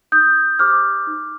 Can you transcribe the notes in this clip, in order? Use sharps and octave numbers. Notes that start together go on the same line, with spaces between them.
D#4 D#6 G6
G4 C5 D6 F6
D#4